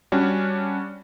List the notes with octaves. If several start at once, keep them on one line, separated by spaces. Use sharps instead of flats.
G3 C#4 D4 F#4